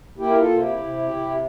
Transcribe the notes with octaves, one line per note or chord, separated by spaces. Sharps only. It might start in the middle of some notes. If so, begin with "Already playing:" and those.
A#3 E4 G4
A#4
F4 A4
C3
E4 G4
C3
C3